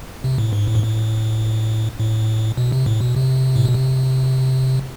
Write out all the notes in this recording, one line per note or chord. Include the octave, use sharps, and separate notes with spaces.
C3
A2
G#2
A2
G#2
A2
A2
B2
C3
A2
B2
C3
A2
B2
C3